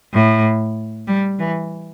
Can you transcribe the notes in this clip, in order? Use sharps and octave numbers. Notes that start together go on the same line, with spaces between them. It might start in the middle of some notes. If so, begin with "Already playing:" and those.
A2
G3
E3